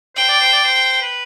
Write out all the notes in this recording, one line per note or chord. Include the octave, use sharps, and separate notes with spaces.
C5 G5
D5
C5
D5
C5
B4